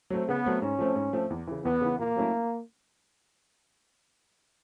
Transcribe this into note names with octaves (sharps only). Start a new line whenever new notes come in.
F#3 A3 C4
C#3 B3
F#3 A3 C4
G#2 C#4
F3 A3 C4
G#2
F3 A3 C4
E2
C#3 E3
E2 B3
C#3 E3
A#2 A#3
F#3 A3 C#4 E4